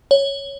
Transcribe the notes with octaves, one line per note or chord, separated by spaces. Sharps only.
C#5